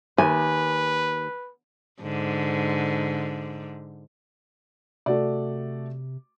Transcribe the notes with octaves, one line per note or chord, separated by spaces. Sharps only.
D#2 B4 G#5
G#2 D3
C3 A3 F#4 D5